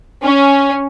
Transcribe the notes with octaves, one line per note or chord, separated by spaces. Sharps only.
C#4